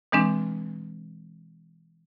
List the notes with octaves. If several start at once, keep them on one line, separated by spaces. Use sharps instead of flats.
B2 E3 G#3 C4 D4